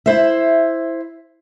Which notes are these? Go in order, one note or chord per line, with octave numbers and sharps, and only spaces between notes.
E4 C5 E5